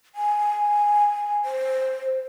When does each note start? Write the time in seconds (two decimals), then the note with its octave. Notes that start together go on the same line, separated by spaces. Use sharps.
0.15 G#5
1.45 C5